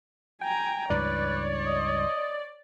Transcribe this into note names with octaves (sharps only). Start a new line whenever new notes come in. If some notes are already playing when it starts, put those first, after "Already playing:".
G5 G#5 A#5
C#2 G2 E3 B4 C#5 D5
D#5